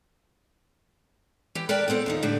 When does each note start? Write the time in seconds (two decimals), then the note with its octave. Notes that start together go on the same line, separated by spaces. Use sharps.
1.55 E3 G4
1.69 A#4 B4 D5 G5 A5
1.88 A2 B3 C4 A4
2.06 D#2 F3 D#4
2.23 A2 D3 A3 G4